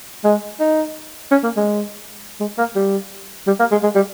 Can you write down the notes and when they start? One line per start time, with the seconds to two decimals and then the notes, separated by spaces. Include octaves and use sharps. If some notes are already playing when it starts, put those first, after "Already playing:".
0.24 G#3
0.60 D#4
1.31 C#4
1.44 A#3
1.57 G#3
2.40 G#3
2.58 A#3
2.75 G3
3.47 G3
3.59 A#3
3.71 G#3
3.83 G#3
3.95 G3